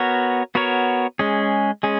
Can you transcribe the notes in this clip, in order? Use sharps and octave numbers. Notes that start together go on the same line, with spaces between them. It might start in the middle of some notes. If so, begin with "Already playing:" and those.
Already playing: B3 F#4 A#4 C#5
B3 F#4 A#4 C#5
G#3 C#4 G#4
G#3 C#4 G#4